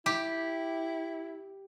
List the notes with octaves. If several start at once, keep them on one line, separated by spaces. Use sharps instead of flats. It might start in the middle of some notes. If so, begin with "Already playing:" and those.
E4 G4